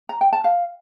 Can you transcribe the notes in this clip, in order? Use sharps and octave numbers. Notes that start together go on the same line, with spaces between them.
A#5
G5
A5
F5